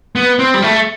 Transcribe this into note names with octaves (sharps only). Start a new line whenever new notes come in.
B3
C4
G3
A3